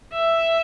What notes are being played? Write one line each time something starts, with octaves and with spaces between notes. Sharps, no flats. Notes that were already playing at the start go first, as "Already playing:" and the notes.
E5